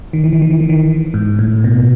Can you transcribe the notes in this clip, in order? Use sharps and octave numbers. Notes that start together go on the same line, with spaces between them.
D#3
E3
D#3
E3
D#3
E3
D#3
G#2
A2
B2